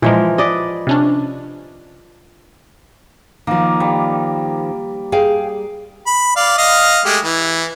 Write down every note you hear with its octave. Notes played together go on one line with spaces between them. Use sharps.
A#2 E3 F3 G#3 A#4
B4 D5 D#5
C3 C#4 D4
D#3 F3 A#3
G3
G#4 F5 G5
B5
D5 F5
D#5 F5
G#3 A3 G4
E3